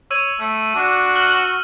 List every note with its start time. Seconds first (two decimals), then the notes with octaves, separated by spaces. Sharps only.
0.11 C#5 E6 D#7
0.40 A3 E6
0.76 D4 F#4
1.15 F6 F#6 F#7